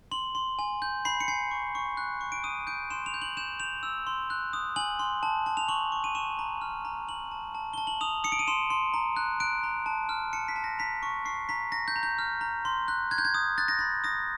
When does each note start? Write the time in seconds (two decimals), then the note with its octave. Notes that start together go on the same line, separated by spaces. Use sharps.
0.11 C6 F#7
0.35 C6
0.59 G#5
0.82 G6
1.05 B5 C7
1.20 C#7
1.28 G#5 C7
1.51 C#6
1.75 C#6
1.97 F#6
2.21 C#6
2.32 D7
2.44 D#6 D#7
2.67 G6 D7
2.91 C6 E7
3.06 F7
3.14 G6
3.22 F#7
3.37 G6 E7
3.60 G6 F7
3.83 E6
4.07 C6
4.30 F#6
4.53 D#6
4.76 G#5 F#7
4.99 C6
5.23 A5
5.46 A5
5.57 F7
5.68 C#6 F#7
5.92 C#6
6.04 D#7
6.15 C#6 E7
6.39 A#5
6.61 F6
6.85 A#5
7.07 A5 F#7
7.31 A5
7.55 A5
7.73 A5 G7
7.87 F#7
8.01 D#6 F7
8.24 D#6 C#7
8.32 D7
8.39 D#7
8.47 C6 E7
8.70 C6
8.94 A#5
9.16 F#6
9.40 F#6 D7
9.64 A#5
9.86 A5
10.09 F6
10.33 A5 C#7
10.48 B6
10.56 A5
10.64 A#6
10.79 A#5 B6
11.03 C#6
11.25 C#6 C7
11.49 A#5 B6
11.72 A#5 A#6
11.88 G6
11.96 A#5
12.03 G6
12.19 F6
12.41 A#5
12.65 C6
12.88 F#6
13.11 F#6 G#6
13.18 G6
13.25 G#6
13.34 D#6
13.58 F#6 A6
13.68 A#6
13.79 B5 A6
14.04 D#6 A#6